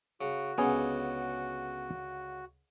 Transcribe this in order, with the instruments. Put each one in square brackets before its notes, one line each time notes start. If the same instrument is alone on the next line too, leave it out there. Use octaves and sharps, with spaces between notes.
[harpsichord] C#3 [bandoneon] F#4
[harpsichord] C#2 D3 [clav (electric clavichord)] B3 C#4 G#4